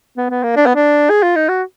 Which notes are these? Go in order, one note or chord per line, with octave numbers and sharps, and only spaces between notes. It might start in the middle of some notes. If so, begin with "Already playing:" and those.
B3
B3
A#3
D4
B3
D4
G#4
F4
D#4
F#4